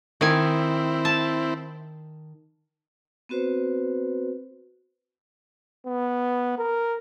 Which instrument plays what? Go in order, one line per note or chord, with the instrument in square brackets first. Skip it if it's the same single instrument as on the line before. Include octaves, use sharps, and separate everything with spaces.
[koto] D#3 G#5 [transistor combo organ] C4 E4
[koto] A5
[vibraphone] B3 C4 F#4 B4 C5
[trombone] B3
A#4